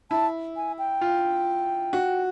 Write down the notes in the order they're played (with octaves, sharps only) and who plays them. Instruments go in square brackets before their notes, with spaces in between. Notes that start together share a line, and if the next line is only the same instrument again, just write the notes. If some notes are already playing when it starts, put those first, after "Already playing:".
[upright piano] E4 [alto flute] A5
[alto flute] G#5
G5
[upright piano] F4
F#4